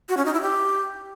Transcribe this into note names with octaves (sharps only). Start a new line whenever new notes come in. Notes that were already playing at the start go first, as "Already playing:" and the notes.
F#4
C#4
D#4
E4
G4